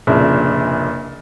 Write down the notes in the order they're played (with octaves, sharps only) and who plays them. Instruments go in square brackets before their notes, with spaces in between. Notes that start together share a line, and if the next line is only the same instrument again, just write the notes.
[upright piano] F1 A#2 C#3 D4 E4